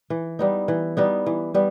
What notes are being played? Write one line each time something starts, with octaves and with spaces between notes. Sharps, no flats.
E3
G3 B3 D#4
E3
G3 B3 D#4
E3
G3 B3